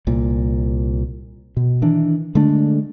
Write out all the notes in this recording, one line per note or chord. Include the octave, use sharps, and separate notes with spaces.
C2 A#2
B2
D#3 E3 D4
D3 G#3 A3 D4